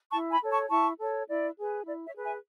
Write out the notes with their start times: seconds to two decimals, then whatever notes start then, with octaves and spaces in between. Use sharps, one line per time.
0.11 E4 A5 C#6
0.31 G#5 B5
0.41 A4 C#5
0.50 A5 C#6
0.69 E4 A5 C#6
0.99 A4 C#5
1.27 E4 D5
1.57 G#4 B4
1.86 E4 D5
2.05 C#5 E5
2.15 G#4 B4
2.24 E5 G#5